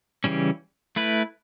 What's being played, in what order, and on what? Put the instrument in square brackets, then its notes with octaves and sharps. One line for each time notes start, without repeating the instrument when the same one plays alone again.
[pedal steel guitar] C#3 E3 G3 C#4
A3 E4 B4